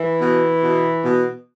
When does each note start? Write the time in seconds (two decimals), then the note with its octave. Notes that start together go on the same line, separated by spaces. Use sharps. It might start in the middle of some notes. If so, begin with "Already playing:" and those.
Already playing: E3
0.20 B2
0.62 B2
1.03 B2